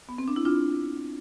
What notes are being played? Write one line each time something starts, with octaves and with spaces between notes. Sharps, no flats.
B3
C4
D4
E4
D4 F4